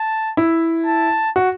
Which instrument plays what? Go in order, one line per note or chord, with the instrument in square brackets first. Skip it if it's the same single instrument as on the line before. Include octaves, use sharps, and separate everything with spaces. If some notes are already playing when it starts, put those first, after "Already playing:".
Already playing: [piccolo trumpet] A5
[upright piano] E4
[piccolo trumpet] A5
[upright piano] F#4